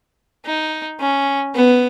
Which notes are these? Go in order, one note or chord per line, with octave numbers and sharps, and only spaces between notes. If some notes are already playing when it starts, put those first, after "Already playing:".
D#4
C#4
B3